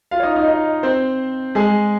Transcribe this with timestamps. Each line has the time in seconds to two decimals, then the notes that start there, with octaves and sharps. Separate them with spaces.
0.11 F4 F5
0.20 C#5
0.23 D#4 D#5
0.36 D#4 D#5
0.48 D#4 D#5
0.83 C4 C5
1.55 G#3 G#4